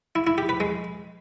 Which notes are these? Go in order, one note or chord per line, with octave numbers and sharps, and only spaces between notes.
E4
E4
G4
B4
G#3